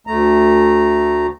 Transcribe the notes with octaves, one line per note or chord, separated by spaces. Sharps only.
D2 A3 A#5